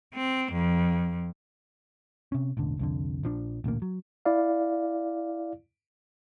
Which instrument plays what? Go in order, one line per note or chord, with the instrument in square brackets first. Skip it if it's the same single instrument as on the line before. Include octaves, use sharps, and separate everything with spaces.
[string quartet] C4
F2
[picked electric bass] C3 C#4
E1 A1 D3
C2 F2 D3
A#1 F3 D4
A1 D2 A#2 A#3
F#3
[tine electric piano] E4 D5 F5